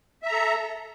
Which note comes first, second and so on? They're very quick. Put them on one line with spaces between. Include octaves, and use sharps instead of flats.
E5 A#5 A4